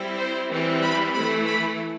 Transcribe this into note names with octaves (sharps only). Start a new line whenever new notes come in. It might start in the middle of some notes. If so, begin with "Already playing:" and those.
Already playing: G3 C4 E4
C5
E3 G3 C4 E4
B5
E3 A3 E4 B5
B5